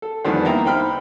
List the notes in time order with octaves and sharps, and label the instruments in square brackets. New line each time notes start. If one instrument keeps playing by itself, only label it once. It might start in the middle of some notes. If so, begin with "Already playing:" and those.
[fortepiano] A4
E2 D3 D#3 F3 G3 B3
A#3 D#4 E4 G5 A#5
D#4 C5 G5 B5 F6